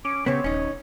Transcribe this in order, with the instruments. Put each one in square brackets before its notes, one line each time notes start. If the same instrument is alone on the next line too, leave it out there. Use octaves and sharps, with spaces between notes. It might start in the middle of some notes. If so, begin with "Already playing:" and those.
[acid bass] C#4 [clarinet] D6
[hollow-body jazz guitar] C#3 B3 [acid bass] C4 [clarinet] C#5
[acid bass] D#1 [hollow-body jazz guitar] C#4 D#4